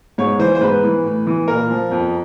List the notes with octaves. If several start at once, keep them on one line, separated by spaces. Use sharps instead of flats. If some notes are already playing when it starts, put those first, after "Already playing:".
G#2 C#5
E3 C5
C5
G#2 B4
E3
A2
E3
A#2 A#4
F3
F2